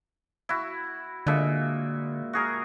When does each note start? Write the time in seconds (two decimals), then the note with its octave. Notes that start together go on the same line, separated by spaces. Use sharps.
0.49 E4 F#4
1.27 A#2 D3 G#3 E5
2.33 F#4 G#4 A#4